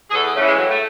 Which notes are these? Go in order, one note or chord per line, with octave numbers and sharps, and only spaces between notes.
G#4
E2 A4
G#4
C#3 E3 A3
G#3
A2 F#3
A3